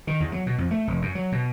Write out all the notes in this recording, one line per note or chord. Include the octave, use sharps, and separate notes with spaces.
D#3
E2
F#3
B2
F2
A3
F1
F#2
F#3
B2